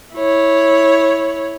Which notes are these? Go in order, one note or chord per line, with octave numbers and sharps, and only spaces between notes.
E4 C#5